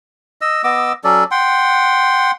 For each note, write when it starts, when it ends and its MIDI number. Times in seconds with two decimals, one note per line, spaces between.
0.41 0.62 75
0.41 0.62 88
0.64 0.93 59
0.64 0.93 75
0.64 0.93 86
0.64 0.93 88
1.04 1.24 54
1.04 1.24 61
1.04 1.24 69
1.04 1.24 74
1.31 2.31 78
1.31 2.31 79
1.31 2.31 84